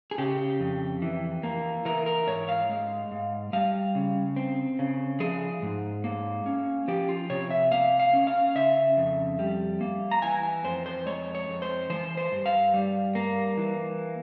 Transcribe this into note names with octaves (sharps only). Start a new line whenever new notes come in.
G#4
C#3 G4
F2
E3
A#3
E3 A#4
A#4
G#2 C#5
F5
G#3
G#2
G3 F5
C#3
C4
C#3
F3 G#4
G#2
A#3
C#4
F3 G4
F4
C3 C#5
E5
A#3 F5
F5
C#4
F5
C#3 E5
F2
G3
A#3
A#5
E3 G#5
G#5
F2 C5
C5
G#3 C#5
C#5
F2
C5
E3 C5
C5
G2
F5
G3
A#3
E3